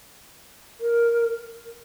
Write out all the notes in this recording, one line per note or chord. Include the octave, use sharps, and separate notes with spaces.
A#4